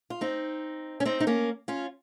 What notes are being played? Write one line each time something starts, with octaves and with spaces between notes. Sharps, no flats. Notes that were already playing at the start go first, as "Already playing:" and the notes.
F4
C4 D#4
C#4
C4 D#4
D#4
A#3 C#4
C#4 F4